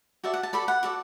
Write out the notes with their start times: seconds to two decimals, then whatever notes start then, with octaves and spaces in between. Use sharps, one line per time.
0.24 F#4 A4 D5 E5
0.34 F#5
0.43 A5
0.53 F#4 A4 D5 B5
0.68 F#5
0.83 F#4 A4 D5